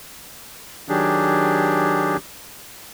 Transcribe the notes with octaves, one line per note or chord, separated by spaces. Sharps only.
D#3 F#3 D4 G4 G#4